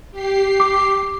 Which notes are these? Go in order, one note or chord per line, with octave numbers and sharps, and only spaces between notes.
G4 C7
D6